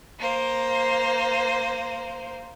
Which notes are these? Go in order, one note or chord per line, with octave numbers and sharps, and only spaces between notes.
A#3 C5